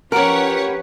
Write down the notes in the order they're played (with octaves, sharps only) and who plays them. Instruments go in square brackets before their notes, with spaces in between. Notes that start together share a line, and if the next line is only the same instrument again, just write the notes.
[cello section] F3 C#4 B4 [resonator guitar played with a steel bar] G4 A#4 [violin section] C#5 F#5